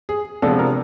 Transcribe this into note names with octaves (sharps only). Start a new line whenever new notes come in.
G#4
C3 F3 G#3 B3 D4 A4
A#4